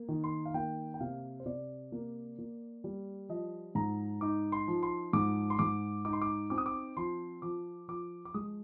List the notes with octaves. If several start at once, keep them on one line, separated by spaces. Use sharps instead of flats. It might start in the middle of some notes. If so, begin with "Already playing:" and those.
Already playing: A#3
D#3
C6
F5
A#3 G5
G5
C3 F5
C5
C3 D5
A#3
A#3
G3
F3 D#5
G#2 A#5
D#4 D6
C6
F3
C6
G#2 D6
C6
G#2 D6
D#4 D6
C6
D6
C4 D6
D#6
D6
F3 C6
F3 D6
F3 D6
D6
G#3 D#6